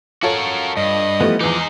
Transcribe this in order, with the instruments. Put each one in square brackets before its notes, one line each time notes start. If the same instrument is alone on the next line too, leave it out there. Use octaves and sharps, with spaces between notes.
[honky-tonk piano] F4 A4 C#5 [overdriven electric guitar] F#4 A#4
[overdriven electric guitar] G2 [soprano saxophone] D#5
[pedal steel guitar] E3 F3 B3 [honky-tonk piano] G3 A3
[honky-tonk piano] E2 E3 [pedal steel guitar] F3 D6 [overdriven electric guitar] D#4 G#4